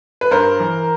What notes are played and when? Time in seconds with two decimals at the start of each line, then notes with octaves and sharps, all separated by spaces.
0.21 B4
0.31 G2 A#4 C5
0.60 E3